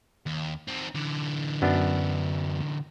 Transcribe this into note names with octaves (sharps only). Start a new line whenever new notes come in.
D#2
C4 D#4
D3 E3
F#2 B3 D4